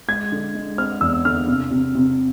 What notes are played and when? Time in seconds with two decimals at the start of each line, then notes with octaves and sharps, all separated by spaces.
0.08 G#3 G#6
0.32 D3
0.55 G#3
0.78 C4 F6
1.01 E2 E6
1.25 D3 F6
1.47 C3
1.71 C3
1.95 C3